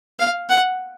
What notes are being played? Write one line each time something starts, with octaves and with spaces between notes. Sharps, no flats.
F5
F#5